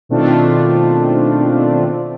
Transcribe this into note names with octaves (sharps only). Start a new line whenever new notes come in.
B2 D#3 A3 C4 D4 F4